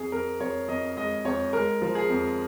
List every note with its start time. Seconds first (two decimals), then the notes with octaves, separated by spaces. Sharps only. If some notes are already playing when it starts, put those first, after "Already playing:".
Already playing: F2 G#4
0.12 F2 A#4
0.40 F2 C#5
0.68 F2 D#5
0.97 G#3 D#5
1.25 F2 C#5
1.53 G#3 A#4
1.82 F3
1.95 G#4
2.09 F2